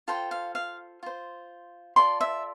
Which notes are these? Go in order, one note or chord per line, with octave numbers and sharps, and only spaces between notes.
F4 A4 C5 G5
F5
F5
F4 C5
F4 A4 D5 C6
E5